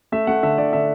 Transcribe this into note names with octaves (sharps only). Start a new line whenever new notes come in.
A3 E5
A3 F#5
D3 E5
D3 D5
D3 E5